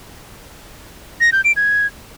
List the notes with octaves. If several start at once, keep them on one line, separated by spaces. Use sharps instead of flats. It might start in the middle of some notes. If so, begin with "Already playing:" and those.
A#6
G6
D7
G#6